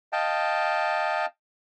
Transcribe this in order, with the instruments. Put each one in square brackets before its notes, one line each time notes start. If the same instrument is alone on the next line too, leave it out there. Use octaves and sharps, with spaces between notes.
[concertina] D#5 F5 G5 A5